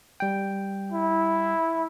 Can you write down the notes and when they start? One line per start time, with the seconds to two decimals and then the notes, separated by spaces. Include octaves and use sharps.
0.20 G3 G5
0.92 E4